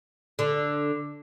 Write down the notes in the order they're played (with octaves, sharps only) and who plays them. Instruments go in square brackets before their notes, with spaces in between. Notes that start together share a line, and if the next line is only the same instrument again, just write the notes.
[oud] D3